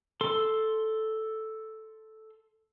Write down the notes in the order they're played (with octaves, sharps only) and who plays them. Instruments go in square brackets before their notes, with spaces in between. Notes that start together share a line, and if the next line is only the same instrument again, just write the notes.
[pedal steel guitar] A4 C6